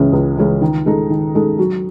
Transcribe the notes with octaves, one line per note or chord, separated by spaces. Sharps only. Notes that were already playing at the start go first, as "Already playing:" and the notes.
Already playing: C#2 C#3 E3 G#3 C#4
C#2
C#3 E3 G#3 C#4
D#3
G#3 D#4 A4
D#3
G#3 D#4 A4
F#3